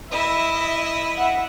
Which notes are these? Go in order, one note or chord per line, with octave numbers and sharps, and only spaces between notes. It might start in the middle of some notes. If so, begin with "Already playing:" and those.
E4 D#5 E5
E5 F#5